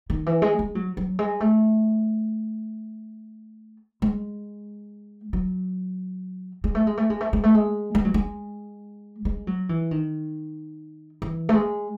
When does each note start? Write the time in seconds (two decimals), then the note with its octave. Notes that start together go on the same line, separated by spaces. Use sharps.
0.10 D#3
0.26 E3
0.42 G#3
0.59 G#3
0.75 F#3
0.97 F#3
1.19 G#3
1.40 A3
4.02 G#3
5.33 F#3
6.64 G#3
6.75 A3
6.87 G#3
6.97 A3
7.10 G#3
7.21 A3
7.33 G#3
7.44 A3
7.55 G#3
7.95 G#3
8.05 F#3
8.14 G#3
9.25 G#3
9.47 F#3
9.69 E3
9.91 D#3
11.22 E3
11.49 A3
11.54 G#3